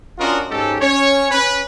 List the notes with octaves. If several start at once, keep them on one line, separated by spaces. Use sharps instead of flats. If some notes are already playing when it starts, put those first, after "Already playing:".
C#4 D4 F4 F#4 A#4 D#5
G#2 C#4 D#4 G4 A4
C#4 C#5
C#4 B4